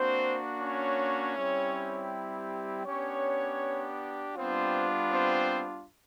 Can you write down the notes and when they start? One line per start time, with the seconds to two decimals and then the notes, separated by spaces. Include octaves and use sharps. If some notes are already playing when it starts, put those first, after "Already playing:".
Already playing: A#3 C4 D4 F#4 C5
0.61 C#4 C#5
1.36 G3 C4 E4 G4
2.86 B3 C#4 D4 G4 C#5
4.36 G3 B3 C4 D4 F4 C5
5.11 C4 C5